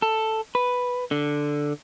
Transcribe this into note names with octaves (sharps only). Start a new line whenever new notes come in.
A4
B4
D3